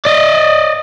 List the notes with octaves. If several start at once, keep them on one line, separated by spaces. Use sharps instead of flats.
D5 D#5